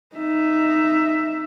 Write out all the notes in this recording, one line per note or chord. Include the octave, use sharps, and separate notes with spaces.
D#4 E5